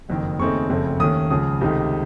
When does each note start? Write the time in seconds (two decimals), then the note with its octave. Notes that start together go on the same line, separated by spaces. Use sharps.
0.09 F#1 F2 D#3
0.39 D#2 C#3 A3 C4 D#4 C#6
0.70 F#1 F2 C#3 A3 C4
1.00 D#2 D#3 A3 C#4 D#6
1.30 C#2 C#3 F3 D#6
1.61 C#2 C3 D#3 A3 D#4